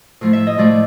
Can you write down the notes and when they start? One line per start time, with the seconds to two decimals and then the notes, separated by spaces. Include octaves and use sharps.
0.21 A2 F3 A3
0.33 E5
0.47 D#5
0.58 A2 F3 A3 D5